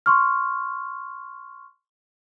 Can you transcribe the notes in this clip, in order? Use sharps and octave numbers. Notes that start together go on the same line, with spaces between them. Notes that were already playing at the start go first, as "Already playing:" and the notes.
C6 C#6 F6